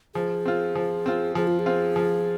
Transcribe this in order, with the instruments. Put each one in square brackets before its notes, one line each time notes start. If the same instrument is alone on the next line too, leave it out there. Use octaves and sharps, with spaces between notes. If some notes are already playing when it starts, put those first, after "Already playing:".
[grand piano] F3 [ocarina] G#4
[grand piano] C4 F4
F3
C4 F4
[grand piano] F3 [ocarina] G#4
[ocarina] F4
G#4
[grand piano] C4 F4
F3